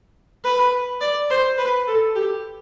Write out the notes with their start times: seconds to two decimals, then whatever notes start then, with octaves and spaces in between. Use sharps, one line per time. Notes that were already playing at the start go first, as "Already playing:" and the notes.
0.44 B4
1.01 D5
1.30 C5
1.58 B4
1.87 A4
2.15 G4